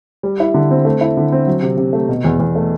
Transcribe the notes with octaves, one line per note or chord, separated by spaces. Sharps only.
G3
E4
D3
C4
A3
E4
D3
C4
F#3
C3
C3
A3
B2
E2
E2
A3